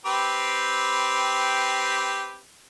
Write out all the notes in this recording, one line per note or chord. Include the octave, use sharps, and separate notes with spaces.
C4 G4 B4